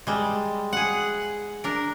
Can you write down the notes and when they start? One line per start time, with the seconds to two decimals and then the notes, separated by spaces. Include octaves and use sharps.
0.07 G3 G#3
0.73 G#4 F#5
1.64 D4 A#4